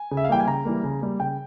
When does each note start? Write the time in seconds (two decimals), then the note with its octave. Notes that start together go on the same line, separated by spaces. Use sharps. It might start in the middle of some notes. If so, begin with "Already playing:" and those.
Already playing: G#5
0.11 C#3
0.17 E5
0.25 F5
0.29 E3 G3 A#3 G5
0.40 G#5
0.47 C#3 A#5
0.65 E3 G3 A#3
0.84 C#3
1.01 G3 A#3
1.20 C#3 G5